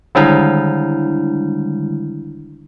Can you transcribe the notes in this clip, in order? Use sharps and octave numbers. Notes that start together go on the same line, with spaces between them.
D3 D#3 G3 G#3 D4 E4